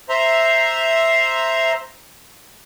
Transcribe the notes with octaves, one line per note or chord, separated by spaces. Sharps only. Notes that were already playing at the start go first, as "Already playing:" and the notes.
C5 E5 A#5 C6